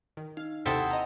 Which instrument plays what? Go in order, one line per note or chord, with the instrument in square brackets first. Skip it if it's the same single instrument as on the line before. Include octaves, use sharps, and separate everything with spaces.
[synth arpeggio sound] D#3
[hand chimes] D#4 [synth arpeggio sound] F5
[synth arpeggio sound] D#2 C3 [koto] C4 E4 A4 [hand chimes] F#5 D#6
[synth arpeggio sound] D#5 A#5